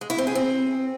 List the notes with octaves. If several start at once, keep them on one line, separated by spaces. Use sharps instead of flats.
G#3
E4
C4
G#4
C4